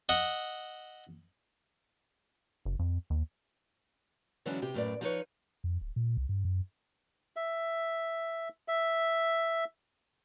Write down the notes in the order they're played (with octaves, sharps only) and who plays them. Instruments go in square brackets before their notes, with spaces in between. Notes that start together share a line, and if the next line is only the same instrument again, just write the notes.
[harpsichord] D#5 E5 F#5
[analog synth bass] F#1
F2
D#2
[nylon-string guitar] D3 E3 F#3 G#3 C#4
C3 G4
F#2 A2 B4 D5
F3 D#4 F4 G#4 B4 C#5
[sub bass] F2
D1
A#2
C2
G2
F#2
[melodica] E5
E5